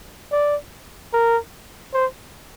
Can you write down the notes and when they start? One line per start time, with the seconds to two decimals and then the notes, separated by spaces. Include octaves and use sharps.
0.32 D5
1.13 A#4
1.94 C5